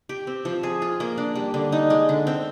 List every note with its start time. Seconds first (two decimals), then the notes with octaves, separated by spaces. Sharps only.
0.09 G4
0.27 C4
0.45 F3
0.63 G#4
0.82 F4
1.00 A#3
1.18 D4
1.36 G3
1.54 D3
1.72 D#4
1.90 G#3
2.09 D3
2.27 C4